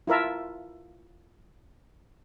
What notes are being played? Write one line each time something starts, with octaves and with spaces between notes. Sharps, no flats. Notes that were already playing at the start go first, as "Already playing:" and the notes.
E4 F4 A#4 E5 A5